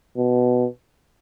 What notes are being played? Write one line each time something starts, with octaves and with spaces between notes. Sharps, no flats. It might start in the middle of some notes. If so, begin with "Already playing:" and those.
B2